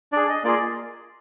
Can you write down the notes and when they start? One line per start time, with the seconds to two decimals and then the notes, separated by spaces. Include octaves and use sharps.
0.12 D4 G#4 D5
0.29 D#5
0.44 A#3 F4 G#4 D5